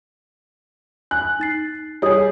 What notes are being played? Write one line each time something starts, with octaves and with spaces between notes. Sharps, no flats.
G#5 F#6
D#4 A6 C7
G3 G#4 C#5 D#5 D#6